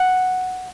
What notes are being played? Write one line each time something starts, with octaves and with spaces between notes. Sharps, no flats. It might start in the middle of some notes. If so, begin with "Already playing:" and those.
Already playing: F#5